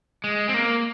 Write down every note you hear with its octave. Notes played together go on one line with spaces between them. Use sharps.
G#3
C4
A#3